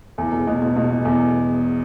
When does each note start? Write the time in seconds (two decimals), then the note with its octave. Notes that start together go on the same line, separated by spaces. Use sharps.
0.18 E2
0.32 E1
0.47 B2
0.62 B2
0.76 B2
0.90 B2
1.05 E2